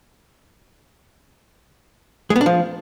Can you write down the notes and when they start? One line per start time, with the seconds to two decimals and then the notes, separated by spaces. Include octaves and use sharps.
2.30 G#3
2.36 B3
2.41 D4
2.46 F3